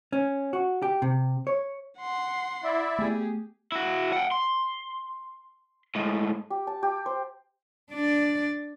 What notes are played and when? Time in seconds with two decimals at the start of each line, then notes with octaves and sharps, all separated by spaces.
0.12 C#4
0.53 F#4
0.82 G4
1.02 C3
1.47 C#5
1.99 F#5 C6
2.64 E4 D5 E5
2.98 A3 B3 G4 G#4
3.72 E4 F#4
4.13 F#5 G5
4.32 C6
5.95 A2 G#3
6.50 G4
6.67 A5
6.83 G4
7.06 C5
7.91 D4 D5